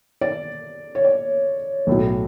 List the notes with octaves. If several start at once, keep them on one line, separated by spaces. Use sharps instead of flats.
D5
C#5
D5
B1 A2 F#3